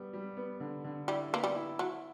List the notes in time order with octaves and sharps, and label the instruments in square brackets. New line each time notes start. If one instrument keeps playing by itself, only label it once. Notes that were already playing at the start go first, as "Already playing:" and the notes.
Already playing: [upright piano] G3 B3
G3
B3
D3
D3
[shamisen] G3 [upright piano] E4
[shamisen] A#3 [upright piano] B3
[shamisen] G3
[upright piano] E4
[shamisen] F#3 [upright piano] E4